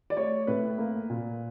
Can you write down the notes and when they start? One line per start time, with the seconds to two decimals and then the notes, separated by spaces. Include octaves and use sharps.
0.10 D5
0.17 A3 C#5
0.47 A2 B4
0.78 A#3
1.10 A#2